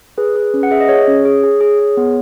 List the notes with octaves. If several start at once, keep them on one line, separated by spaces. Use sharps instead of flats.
G#4 B4
G#4
C#4
F#5
G#4 E5
D#5
G#4 C#5
C#4
G#4
G#4
G#4
G#4
B3